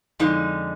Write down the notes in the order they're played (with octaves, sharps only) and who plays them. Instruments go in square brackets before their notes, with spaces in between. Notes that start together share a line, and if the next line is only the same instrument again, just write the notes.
[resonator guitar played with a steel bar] F2 D3 G#3 D#4